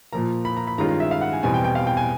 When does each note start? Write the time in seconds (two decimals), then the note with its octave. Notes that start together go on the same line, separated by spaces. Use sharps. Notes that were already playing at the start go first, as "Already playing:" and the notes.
0.13 A#2 F3 A#3 A#5
0.45 B5
0.57 A#5
0.67 B5
0.78 G2 D#3 G#3 C#4 F4 A#5
0.89 A#5
1.00 E5
1.11 F5
1.21 F#5
1.33 G#5
1.43 E2 B2 G3 C4 G#5
1.54 G5
1.64 G5
1.75 F5
1.87 G5
1.97 G#5